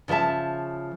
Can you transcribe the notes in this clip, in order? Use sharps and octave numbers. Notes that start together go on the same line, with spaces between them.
C#3 F3 C5 E5 A5